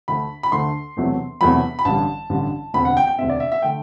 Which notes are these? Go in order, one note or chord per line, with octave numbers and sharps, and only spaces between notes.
D2 D3 A3 B5
B5
D2 D3 A3 C6
E1 E2 C3 F#3 A3
E1 E2 C3 F#3 A3 B5
B5
A1 G2 D3 G3 A5
A1 G2 D3 G3
E1 D2 C3 B5
F#5
G5
G5
E1 D2 C3 E5
D5
E5
E5
D3 A3 G5